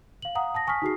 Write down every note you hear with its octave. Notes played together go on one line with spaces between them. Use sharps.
F5 F#7
F5 F#5 A#5 D#6
A5 D#6 A#6
G#5 C#6 D#6 F6 B6
D#4 F#4 G#4 C7